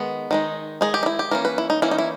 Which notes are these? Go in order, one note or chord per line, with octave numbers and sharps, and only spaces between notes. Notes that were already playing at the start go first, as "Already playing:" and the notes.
Already playing: D#3 G#3 B3
D#3 G#3 D#4
D#3 G#3 D#4 G#4
G4
D#4
E4
G4
E3 A#3 C#4 A#4
B4
E4
D#4
E3 A#3 C#4 E4
D#4
E4